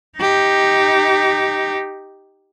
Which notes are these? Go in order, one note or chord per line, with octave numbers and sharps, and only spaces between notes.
D#4 G4